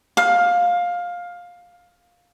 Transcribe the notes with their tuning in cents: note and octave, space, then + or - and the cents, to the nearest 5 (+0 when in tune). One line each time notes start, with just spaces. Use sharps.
F5 +15